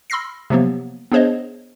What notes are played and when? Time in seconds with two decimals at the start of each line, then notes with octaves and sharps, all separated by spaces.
0.10 B5 C6 E6 F6 A#6 C7
0.50 C3 F3 F#3 A#3 B3
1.12 B3 D4 G#4 C5 C#5 D#5